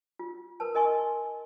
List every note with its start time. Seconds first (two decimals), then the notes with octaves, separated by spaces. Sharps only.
0.19 F4
0.60 A#4 B4 A5
0.75 A#4 D#5 G#5 C6 C#6